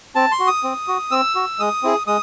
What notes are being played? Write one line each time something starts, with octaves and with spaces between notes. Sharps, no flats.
C4 A5
C6
F#4
D#6
C4
F#4
C4 E6
F#4
G#3 D#6
C4 E4 G#4
G#3 D#6